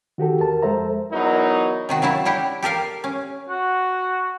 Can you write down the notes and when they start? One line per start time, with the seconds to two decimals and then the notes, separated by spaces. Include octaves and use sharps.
0.18 D#3 F#4 G4 A4
0.40 E2 A#4 A5
0.62 F2 G#3 A4 C5 E5 A#5
1.11 E2 F#3 D#4 E4 A#4
1.89 C3 D#3 F#4
2.02 C#3 F#3 E4 A5
2.25 D4 E4 G4
2.62 G4 A4 A#4 F5
3.04 C#4
3.49 F#4